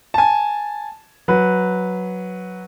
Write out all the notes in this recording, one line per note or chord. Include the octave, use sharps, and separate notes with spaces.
G#5 A5
F#3 B4